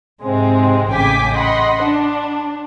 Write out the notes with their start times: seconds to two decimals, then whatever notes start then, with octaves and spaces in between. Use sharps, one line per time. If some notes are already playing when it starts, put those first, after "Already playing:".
0.22 G#2 C3 G#3 C4
0.89 A1 C#3 G5 G#5 D6 B6
1.33 D#5 F#5 B5 C6
1.83 D4